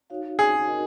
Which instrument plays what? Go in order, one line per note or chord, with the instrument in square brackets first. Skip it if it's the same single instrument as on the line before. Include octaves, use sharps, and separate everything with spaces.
[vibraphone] D#4 F#4 C#5 F5
[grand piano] G#4
[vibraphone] D#4 F#4 A#4 D#5